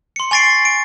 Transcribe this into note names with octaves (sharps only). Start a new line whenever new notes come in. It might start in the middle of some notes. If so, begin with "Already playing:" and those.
C6 C#7
G#5 C#6 A6 C7 D7
D7